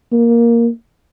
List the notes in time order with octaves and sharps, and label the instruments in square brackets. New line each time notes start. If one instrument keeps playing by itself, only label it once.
[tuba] A#3